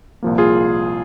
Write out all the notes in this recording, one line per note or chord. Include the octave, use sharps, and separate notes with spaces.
C2 A#2 F3 A#3
F4 G#4